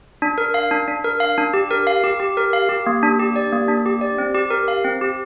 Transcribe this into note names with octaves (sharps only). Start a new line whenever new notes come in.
D4
A#4
F5
D4
D4
A#4
F5
D4
G4
A#4
F5
G4
G4
A#4
F5
G4
A#3
D4
G4
D5
A#3
D4
G4
D5
C4
G4
A#4
F5
C4
G4